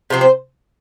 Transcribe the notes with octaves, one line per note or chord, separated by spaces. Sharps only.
C3 F3 C4
C5